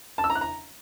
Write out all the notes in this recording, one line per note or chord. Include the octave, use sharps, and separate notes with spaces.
A5
E6
A#5
F#6
A#5